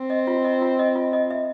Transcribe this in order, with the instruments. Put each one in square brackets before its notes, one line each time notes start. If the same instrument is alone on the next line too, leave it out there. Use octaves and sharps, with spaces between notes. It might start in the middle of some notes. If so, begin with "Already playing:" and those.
Already playing: [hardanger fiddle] C4
[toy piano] D#5
F4
D#5
F4
D#5
F4
D#5
E5